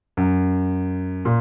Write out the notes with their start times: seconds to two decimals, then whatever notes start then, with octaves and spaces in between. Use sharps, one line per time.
0.17 F#2
1.25 A#2